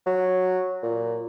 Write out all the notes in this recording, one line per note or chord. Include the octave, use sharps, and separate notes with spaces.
F#3
A#2